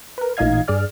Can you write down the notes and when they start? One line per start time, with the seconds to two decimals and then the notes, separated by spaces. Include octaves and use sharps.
0.18 A#4 B4
0.37 A1 A#2 D#4 D#5 F5 G#6
0.68 G2 G#4 D5 F6